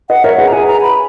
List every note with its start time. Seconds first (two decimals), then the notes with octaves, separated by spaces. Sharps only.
0.10 B4 D#5 F#5
0.24 A#4 C#5 E5
0.38 G#4 B4 F#5
0.48 A#5
0.52 G#4 B4 G#5
0.67 A#5
0.82 B5